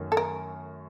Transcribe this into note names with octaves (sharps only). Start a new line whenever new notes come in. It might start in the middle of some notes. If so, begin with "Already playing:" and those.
Already playing: F#2 D#3 A3 C#4
A4
A#4